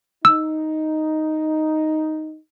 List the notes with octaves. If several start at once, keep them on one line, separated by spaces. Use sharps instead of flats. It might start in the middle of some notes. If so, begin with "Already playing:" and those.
D#4 E6